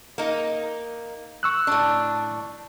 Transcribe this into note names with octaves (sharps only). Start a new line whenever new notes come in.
A#3 D#4
C#6 E6 F#6
A2 D4